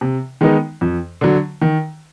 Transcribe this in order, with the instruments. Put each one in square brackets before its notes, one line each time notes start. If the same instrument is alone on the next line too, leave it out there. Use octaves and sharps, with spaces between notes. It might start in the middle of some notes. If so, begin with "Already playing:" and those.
[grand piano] C3
D#3 G#3 B3 D#4
F2
D3 F#3
D#3